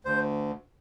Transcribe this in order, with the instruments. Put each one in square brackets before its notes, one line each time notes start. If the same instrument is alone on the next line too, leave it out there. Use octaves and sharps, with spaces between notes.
[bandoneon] D2 C5